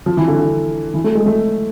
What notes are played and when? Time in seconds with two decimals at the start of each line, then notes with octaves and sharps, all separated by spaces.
0.06 F3
0.17 E3
0.28 D3
0.39 D3
0.94 E3
1.04 A3
1.15 G#3
1.26 A3